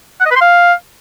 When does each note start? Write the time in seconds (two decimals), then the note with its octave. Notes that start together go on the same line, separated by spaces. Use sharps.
0.20 F#5
0.26 D#5
0.31 B4
0.36 C6
0.41 F5